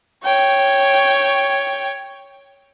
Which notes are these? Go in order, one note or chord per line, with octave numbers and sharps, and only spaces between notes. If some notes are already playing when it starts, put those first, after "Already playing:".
C#5 G5